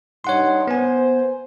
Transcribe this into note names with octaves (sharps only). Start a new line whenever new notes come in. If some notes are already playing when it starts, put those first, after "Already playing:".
G2 D#4 C#5 F#5 C6
B3 C5 G#5